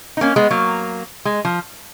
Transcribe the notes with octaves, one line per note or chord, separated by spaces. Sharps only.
D#4
A#3 C#4
G#3 B3
F#3 A#3
G#3
F3